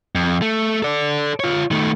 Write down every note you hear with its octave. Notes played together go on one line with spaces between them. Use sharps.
F2
A3
A4 D5
F4 C#5
D#3 A3